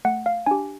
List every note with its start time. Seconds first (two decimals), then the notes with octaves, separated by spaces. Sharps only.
0.05 A3 F#5
0.26 F5
0.46 D4 G4 G#5